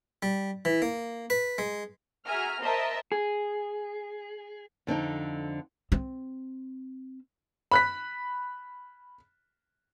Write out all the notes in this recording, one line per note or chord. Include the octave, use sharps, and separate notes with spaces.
G3
E3
A#3
B4
G#3
F#4 G#4 E5 G#5 A#5 F6
A#4 C5 D#5 E5 A5 A#5
G#4
F2 D3 C4 D#4
C4
B5 F#6 B6